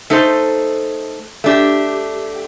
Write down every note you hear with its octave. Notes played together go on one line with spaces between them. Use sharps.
A3 D#4 A4 C5
A3 D4 G4